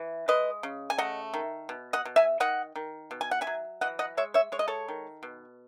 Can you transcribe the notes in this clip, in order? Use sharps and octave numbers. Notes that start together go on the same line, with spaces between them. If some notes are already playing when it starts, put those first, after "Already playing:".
Already playing: E3
G#3 B4 D#5
C#3
G#5
A3 D#5 F#5
D#3
B2
D#5 F#5
B2
E5 G#5
D#3 D#5 F#5
D#3
B2
G#5
F#5
E5 G#5
F#3
E3 D#5 F#5
D#5 F#5
G#3 C#5 E5
C#5 E5
G#3 C#5
D#5
A4 C#5
D#3
B2